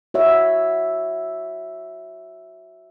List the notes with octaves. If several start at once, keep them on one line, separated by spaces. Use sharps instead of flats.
F#4 C#5 E5